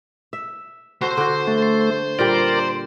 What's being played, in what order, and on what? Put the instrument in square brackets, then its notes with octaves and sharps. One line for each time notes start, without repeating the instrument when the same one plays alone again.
[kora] E5
[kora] F#4 A4 [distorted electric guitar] C5 C6
[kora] D3 F#4
[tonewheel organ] A3
[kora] A#2 G3 G4 [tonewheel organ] A#4 D5